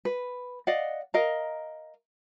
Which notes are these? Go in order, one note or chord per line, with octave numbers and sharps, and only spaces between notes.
B4
D5 D#5 F5 F#5
A#4 D#5 F5 A#5